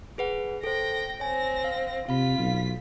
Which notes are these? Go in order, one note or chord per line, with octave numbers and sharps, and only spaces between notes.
G#4 B4 F#5
A4 C5 G5 A#6
C4 C#5 G#5 A#6
F5
C3 F4 F5 B5 B6
B1